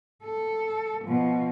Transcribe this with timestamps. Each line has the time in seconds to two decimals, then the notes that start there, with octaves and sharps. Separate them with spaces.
0.24 A4
1.05 B2 F3